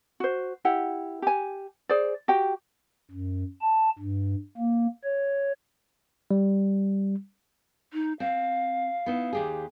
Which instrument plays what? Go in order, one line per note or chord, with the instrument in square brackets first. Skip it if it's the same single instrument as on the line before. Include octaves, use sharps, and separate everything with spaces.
[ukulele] F#4 C5
E4 G4 F#5
G4 G#5
G#4 C5 D5
F#4 G4 G5
[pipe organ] F#2
A5
G2
A#3
C#5
[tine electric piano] G3
[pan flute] D#4
[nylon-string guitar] C4 [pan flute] F5
[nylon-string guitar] B3 D#4 E4
D#2 G4 G#4